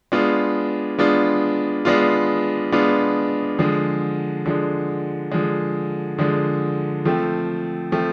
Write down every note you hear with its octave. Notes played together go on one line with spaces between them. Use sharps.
G#3 B3 D4 F4
G#3 B3 D4 F4
G#3 B3 D4 F4
G#3 B3 D4 F4
D3 F3 G#3
D3 F3 G#3
D3 F3 G#3
D3 F3 G#3
F3 A3 C4
F3 A3 C4